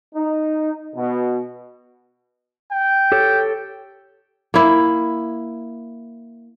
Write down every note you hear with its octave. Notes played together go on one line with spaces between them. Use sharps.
D#4
B2
G5
G4 A4 C#5
A#3 E4